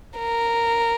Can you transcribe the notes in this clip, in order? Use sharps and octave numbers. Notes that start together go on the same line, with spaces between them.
A#4